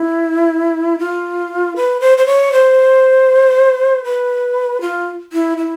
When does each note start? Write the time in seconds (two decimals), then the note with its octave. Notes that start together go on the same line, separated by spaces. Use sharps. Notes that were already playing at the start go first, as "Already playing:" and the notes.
Already playing: E4
0.99 F4
1.76 B4
2.01 C5
2.18 C5
2.26 C#5
2.52 C5
4.04 B4
4.81 F4
5.33 E4
5.58 E4